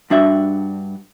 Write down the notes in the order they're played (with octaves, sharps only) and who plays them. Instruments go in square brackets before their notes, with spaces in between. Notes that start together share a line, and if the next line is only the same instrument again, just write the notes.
[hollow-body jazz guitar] G2 D4 F#4 E5